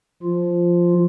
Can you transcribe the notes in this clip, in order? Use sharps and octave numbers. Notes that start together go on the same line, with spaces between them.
F3 F4